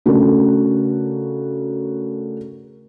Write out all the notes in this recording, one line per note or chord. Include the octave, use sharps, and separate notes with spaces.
C#3 A3 D4 F#4 A#4